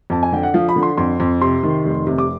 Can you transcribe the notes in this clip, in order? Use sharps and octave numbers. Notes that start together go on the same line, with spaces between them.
F2 A5
G#5
D3 G5
F#5
F3 F5
B5
D3
C6
F2 C6
F2
C3 C6
D#3
F1
C3
D6